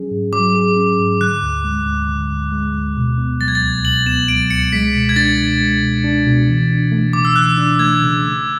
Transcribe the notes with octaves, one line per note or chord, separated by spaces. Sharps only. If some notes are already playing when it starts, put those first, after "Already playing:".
Already playing: F#3 C#4 G#4
G#2
F#3 D6
G#4
C#4
G#2
D3 F#6
D2
G#3
D2
D3
D2
G#3
D2
B2
B3
F#3 A6
G#6
A6
C#2
B2 F#7
B3 E7
F#3 D7
C#2 C#7
G#3 B6
B2
G#6
D4 A6
B2
G#3
B2
D4
B2
E3
D4
A3
C#3 D6
E6
E3 F#6
D4
A3 G#6
C#3
A3